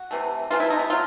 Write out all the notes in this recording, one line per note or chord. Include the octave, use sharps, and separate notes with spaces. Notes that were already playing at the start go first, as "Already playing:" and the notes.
Already playing: F#4
C3 E3 A3
C3 E3 A3 F4
E4
D#4
E4
F#3 A3 F4